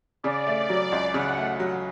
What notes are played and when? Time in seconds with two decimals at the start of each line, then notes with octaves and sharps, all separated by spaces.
0.23 C#3 D5
0.47 A3
0.70 F#3
0.92 C#2
1.14 C#3 F#5
1.37 A3
1.60 F#3